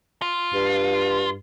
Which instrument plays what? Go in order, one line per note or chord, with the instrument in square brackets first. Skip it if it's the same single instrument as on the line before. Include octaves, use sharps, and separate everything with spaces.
[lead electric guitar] F4
[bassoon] G2